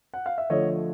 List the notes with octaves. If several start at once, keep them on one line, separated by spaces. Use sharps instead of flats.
F#5
F5
E5
D3 F3 A3 C#5 D#5